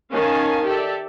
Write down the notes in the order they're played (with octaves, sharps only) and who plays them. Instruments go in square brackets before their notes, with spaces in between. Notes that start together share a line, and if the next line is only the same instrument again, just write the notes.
[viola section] D#3 C#4 F5 G#5 A5
G4 A4 D5 E5